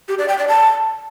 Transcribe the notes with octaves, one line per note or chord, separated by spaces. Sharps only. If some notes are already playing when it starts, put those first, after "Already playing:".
G4
D5
G5
D5
A5